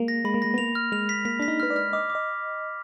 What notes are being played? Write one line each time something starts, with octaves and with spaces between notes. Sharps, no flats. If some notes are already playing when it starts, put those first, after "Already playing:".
Already playing: G#3 A#3
A#6
G#3 B5
A#3
G#3 A#6
B3
A#3 F7
F6
G#3 F7
B6
A#3 B6
D4 B6
D#4
B4 F6
D5
F6
D#5 D6
D6
D#5